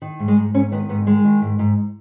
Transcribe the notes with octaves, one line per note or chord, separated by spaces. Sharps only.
D#3
G#2
G#3
G#2
G#2 C#4
D#3 B3
G#2 B3
D#3 G#3
D#3
G#2
G#2